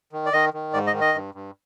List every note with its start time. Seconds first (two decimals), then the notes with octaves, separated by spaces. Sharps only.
0.12 D#3
0.26 D5
0.33 D#3 D#5
0.54 D#3
0.73 G#2 D5
0.87 D#5
0.93 D#3
1.01 D#5
1.14 G2
1.34 G2